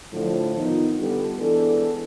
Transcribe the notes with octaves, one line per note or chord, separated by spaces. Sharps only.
A2 D3 F3
D#3 B3 D#4 F4
D3 G3 B3 F4 G4 A4
E3 G#3 B3 D4 A4